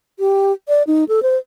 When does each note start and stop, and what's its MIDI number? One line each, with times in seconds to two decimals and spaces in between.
0.19 0.52 67
0.68 0.83 74
0.87 1.04 63
1.08 1.22 69
1.22 1.38 72